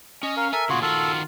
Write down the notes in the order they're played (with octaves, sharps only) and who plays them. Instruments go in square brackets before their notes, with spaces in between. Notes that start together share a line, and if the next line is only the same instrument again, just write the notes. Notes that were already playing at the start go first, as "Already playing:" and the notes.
[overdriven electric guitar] C#4 [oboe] D#5
[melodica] A#4 [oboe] F5
[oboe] A4 [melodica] A#4 E5 [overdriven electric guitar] G#5
[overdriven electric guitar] A#2 C#3 [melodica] F4 F#4 [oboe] G#4
[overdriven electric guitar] D#3 F#4 [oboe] F4 [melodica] A4